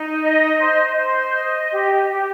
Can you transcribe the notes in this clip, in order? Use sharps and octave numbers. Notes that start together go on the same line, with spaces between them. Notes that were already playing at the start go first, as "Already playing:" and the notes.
Already playing: D#4
D#5
C5
C5
D#5
G4
G4